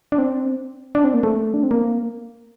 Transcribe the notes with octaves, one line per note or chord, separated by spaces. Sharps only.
D4
C4
D4
C4
A#3
A3
D4
C4
A#3